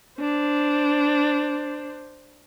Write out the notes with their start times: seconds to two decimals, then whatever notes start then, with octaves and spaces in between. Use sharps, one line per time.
0.20 D4 C5